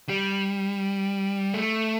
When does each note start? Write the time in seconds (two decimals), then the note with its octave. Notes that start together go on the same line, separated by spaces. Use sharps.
0.09 G3
1.54 A3